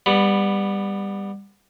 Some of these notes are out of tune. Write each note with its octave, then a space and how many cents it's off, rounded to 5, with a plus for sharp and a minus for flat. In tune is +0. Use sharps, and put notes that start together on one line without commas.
G3 +20 B3 -5